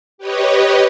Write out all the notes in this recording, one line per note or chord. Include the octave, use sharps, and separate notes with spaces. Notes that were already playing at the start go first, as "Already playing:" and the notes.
G4 B4 C#5 D#5